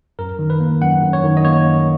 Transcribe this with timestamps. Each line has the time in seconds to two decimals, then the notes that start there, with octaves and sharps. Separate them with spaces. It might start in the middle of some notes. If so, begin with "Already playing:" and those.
0.19 F#2 A#4
0.39 D#3
0.50 B4
0.60 A#3
0.81 F#2 F#5
1.02 F#2
1.13 C#5
1.24 D#3
1.37 D#5
1.45 A#3 C#5
1.66 F#2